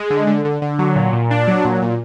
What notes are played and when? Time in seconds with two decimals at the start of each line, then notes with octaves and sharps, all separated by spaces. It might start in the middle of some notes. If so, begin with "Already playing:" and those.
Already playing: G#3
0.10 D3
0.27 D3
0.45 D3
0.62 D3
0.79 F#3
0.96 A#2
1.13 A#2
1.31 D4
1.48 F#3
1.65 A#2
1.82 A#2